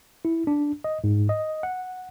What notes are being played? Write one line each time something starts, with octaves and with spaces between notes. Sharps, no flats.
E4
D4
D#5
G#2
D#5
F#5